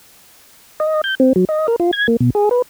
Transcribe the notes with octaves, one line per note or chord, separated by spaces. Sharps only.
D#5
G6
C4
F#3
D#5
A#4
F4
G#6
A#3
B2
G#4
B4